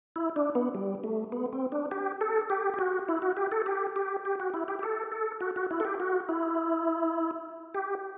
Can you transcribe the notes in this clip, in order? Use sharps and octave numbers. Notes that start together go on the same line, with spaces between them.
E4
D4
B3
G3
A3
B3
C4
D4
G4
A4
G4
G4
F#4
E4
F#4
G4
A4
G4
G4
G4
F#4
E4
G4
G4
A4
A4
F#4
F#4
E4
A4
G4
F#4
E4
G4